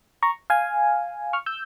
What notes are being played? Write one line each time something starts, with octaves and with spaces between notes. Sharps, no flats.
A#5 C#6
F5 G#5
C#6 F6
E6 G6